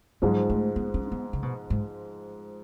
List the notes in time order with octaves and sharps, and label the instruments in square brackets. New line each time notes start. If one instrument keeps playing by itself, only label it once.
[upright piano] G#2 F3 G#3 [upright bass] F#3
[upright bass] A3
B3
C#4
B3
C#3
B2
G#2